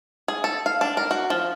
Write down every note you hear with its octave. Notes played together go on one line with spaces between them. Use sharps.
G#4
A4
F5
D4
A#4
F#4
F3